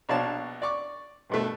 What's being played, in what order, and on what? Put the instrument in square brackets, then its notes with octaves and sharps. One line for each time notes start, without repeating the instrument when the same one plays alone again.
[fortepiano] A#1 B2 C#5 D5 F5 A5
D5 C#6 D6
G2 B2 A3